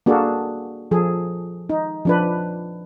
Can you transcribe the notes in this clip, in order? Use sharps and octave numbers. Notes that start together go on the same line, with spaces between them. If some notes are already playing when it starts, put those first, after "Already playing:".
A#3 D4 F#4 G#4 A4
F3 G#4 A4
D#4
F3 D4 B4